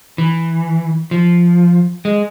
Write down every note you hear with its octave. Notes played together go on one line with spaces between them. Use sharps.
E3
F3
G#3